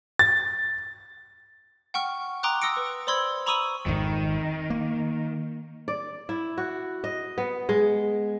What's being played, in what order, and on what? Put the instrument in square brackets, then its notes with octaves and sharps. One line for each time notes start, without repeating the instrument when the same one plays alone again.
[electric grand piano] A6
[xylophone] F#5 G5 C#6 F6
G5 A#5 C6 D6 D#6 F#6
C6 D#6 E6 A#6 C#7 D7
B4
C5 D5 B5 C6 E6 G#6
A#5 B5 C#6 D#6 E6 D#7
[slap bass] G#1 F2 [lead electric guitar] D#3
[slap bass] A#3
[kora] D5
E4
F#4
D#5
B3
G#3